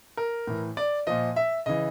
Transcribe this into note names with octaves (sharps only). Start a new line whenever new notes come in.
A#4
A2 E3
D5
A#2 F3 D#5
E5
C#3 E3 D#5